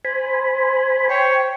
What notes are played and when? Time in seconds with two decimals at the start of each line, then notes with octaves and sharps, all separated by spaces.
0.05 C5 G#5 B5
1.09 C5 C#5 G5